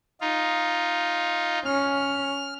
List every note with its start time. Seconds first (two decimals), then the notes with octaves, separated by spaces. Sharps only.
0.21 D#4 F4
1.65 C#4 F6